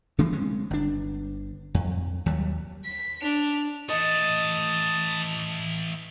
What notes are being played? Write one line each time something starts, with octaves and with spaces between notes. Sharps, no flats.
C#3 E3 A3 A#3
G#3 C4 C#4
G1 D4
F2
D#2 F#3 G3
B6
D4 F7
E3 A3 D#5 A5 D#6 A6